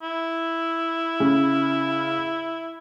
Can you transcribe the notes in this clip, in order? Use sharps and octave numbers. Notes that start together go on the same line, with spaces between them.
E4
C#3